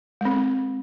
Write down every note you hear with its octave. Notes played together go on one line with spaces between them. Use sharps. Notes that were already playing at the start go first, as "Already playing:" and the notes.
G#3 C4